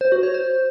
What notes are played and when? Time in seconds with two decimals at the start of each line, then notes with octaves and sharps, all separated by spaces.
0.01 C5
0.12 F#4
0.23 C#5
0.34 C5